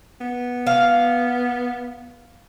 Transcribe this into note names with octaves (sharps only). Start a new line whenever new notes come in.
B3
F5